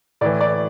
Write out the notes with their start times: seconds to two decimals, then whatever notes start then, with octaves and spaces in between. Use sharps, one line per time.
0.21 A2 E3 D5
0.41 D5